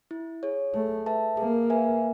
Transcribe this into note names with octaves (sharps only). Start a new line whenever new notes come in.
E4
G#4 C#5
A3 G#4
B4 E5 A5
A#3 G#4
B4 E5 G#5